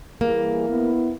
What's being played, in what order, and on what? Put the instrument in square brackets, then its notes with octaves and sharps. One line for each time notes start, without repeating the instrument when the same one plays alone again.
[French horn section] E3 G3 G#4 [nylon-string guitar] A#3
[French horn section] B3 E4